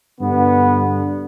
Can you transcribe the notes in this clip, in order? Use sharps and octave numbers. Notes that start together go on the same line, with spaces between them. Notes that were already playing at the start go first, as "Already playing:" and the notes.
G2 D3 B3